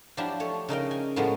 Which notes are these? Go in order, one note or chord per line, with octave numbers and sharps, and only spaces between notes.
F3 F#3 D4 E4 G4
A3 C#5
C#3 D#4 A#4 G5
G#5
A2 F3 F#3 G#3 A#3 B3